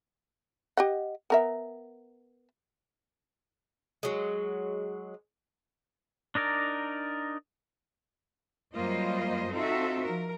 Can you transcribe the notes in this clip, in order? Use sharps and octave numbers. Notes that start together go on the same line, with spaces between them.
G4 D#5 F#5
B3 A#4 E5
F#3 G#3
D4 D#4 A#4 D5
F#2 G3 A#3 F4 C5 D#5
C4 D#4 F4 F#4 A4 E5
F3 A#4